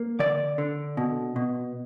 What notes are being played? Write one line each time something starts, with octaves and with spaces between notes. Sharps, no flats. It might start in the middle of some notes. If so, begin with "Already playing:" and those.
Already playing: A#3
D3 D5
D3
B2
B2